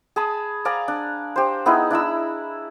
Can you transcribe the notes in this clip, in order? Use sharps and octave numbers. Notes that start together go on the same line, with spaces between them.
G#4 A5 B5 D#6
D5 F5 G#5 A#5
D4
G4 C5
B3 D#4 E4 G#4
D4 E4 A#5 E6